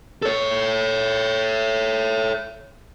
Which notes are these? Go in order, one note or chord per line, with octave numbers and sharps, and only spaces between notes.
A4 C#5